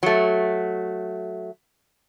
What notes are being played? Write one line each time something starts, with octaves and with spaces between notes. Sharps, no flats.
F#3 A3